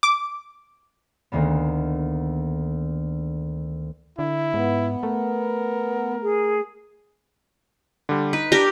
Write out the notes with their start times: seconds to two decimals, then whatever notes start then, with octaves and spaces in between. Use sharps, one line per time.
0.03 D6
1.32 D2 D#3 A#3 B3
4.19 D3 E4
4.54 G#2 B3
5.03 A3 A#4
6.23 G#4
8.09 D3 G3
8.33 D#4 B4
8.52 D4 G4 A#4